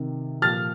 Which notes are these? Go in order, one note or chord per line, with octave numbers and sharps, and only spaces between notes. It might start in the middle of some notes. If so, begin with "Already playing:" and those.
Already playing: C3 D#3
A#2 F3 F6 A6